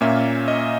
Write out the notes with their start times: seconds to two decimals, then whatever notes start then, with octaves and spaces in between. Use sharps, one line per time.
0.01 A#2 A#3 C#4 E5
0.48 D#5